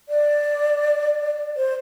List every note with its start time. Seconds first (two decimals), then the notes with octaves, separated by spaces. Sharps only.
0.09 D5
1.57 C5